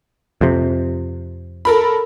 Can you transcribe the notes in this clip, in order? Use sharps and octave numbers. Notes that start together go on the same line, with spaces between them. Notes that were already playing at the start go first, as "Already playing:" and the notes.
F2 C3
A4 A#4 B5